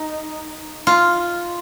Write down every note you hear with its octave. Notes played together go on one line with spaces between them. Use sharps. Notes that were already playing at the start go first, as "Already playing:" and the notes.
Already playing: D#4
F4